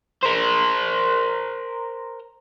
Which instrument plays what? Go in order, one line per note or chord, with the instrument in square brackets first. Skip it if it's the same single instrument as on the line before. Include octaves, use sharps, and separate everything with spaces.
[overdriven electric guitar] A#4 C5